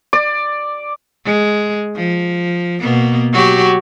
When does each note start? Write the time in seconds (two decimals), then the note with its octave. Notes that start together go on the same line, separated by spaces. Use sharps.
0.13 D5
1.26 G#3
1.96 F3
2.81 B2 A#3 B3
3.33 F#3 F#4 G4